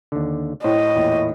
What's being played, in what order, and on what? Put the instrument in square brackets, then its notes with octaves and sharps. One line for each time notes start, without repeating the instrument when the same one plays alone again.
[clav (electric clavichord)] D#2 D3
[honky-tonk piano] A2 [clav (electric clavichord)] C5 [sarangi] D#5
[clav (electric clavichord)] E2 A#2 E4